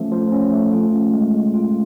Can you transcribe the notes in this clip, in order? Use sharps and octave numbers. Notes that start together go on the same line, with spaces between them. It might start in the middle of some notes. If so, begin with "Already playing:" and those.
Already playing: F3 A3 C#4
F3
C#4
A3
F4
C#4
G#3
G#3
F4